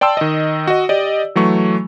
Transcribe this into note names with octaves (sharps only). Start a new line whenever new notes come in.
D5 G5 A5 C6 E6
D#3 D#5
F#4 D#5
G4 D5 D#5
E3 F#3 A3 C#6